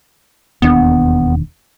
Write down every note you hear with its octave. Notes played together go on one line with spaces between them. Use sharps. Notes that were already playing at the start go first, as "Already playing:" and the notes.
E1 D#2 B3 D4